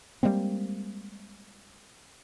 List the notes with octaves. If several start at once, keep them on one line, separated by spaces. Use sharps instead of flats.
G3 G#3 A#3 C4